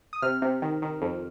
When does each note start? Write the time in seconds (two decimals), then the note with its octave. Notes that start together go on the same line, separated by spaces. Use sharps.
0.13 D#6
0.22 C3 F6
0.42 C3
0.62 D#3
0.82 D#3
1.02 F2